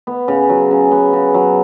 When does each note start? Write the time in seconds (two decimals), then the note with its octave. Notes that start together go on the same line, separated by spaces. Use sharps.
0.07 B3
0.28 C#3
0.49 F#3
0.71 C#3
0.91 B3
1.13 C#3
1.34 F#3